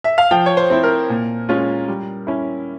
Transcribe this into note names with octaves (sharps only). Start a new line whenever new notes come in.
E5
F5
F3 G5
C#5
C5
C4 E4
A#4
A#2
G#3 C#4 F4
G3
C#4 E4